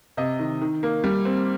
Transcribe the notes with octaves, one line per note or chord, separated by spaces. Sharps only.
C3 D#5
D#3
D#3
A#3
G3
C4